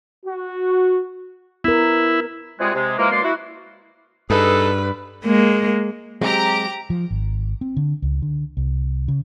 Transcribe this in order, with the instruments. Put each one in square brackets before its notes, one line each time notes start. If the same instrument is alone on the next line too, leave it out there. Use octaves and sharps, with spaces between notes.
[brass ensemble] F#4
[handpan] B3 A#4 [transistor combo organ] E4
[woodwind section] C3 G3 G#3 F4 F#4 G#4
C3 G#3
E3 F3 G#3 A#3
F#2 B2 G#3 A#3 D5 C6
E4 F#4
[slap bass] G2 [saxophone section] D#4 G#4 A4 [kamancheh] B4
[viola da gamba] G#3 A#3
[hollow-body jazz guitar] F#3 G#3 C4 [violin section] G4 A#5 D7
[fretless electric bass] F3
G#1
C4
D3
C#2
D3
C2
C#3